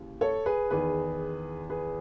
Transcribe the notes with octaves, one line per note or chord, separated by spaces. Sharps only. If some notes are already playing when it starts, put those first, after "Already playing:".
Already playing: D#2 C#3 E3
A4 C#5
G#4 B4
E2 D#3 G#4 B4
G#4 B4